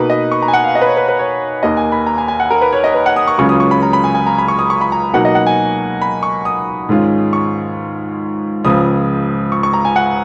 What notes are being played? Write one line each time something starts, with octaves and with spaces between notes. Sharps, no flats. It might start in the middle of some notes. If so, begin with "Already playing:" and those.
Already playing: B2 A#3 D#4 B4
D#5
C#6
A#5
G#5
F#5
F5
D#5
B4
C#5
B4
B4
C#5
D#2 D#3 A#3 D#5
G#5
B5
A#5
G#5
G#5
F#5
A#4
B4
C#5
D#5
B4
F#5
D#6
C#6
C#2 C#3 F#3 C#4 F4 C#6
D#6
C#6
B5
A#5
B5
G#5
G#5
A#5
B5
C#6
D#6
C#6
B5
A#5
B2 F#3 A#3 D#4 F#5
D#5
F#5
G#5
B5
C#6
D#6
G#2 D#3 G#3 C#4 F4
C#6
C#2 C#3 F3 D#6
C#6
C#6
A#5
G#5
F#5